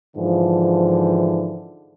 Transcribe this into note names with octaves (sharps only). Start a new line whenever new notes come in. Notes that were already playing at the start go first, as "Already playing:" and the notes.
G#2 D3 E3 F3